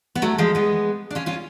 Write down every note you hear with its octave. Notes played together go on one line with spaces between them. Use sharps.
B3
F#3 A3
F3 G#3
G#3 B3
D4
C#4 F4
C#4 F4